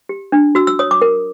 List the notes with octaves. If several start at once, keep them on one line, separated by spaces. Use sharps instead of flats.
G4
D4
F#4 E6
E6
C#5 D#6
D6
A#4